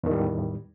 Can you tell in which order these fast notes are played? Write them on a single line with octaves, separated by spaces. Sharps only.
E2 D#3 A2 G3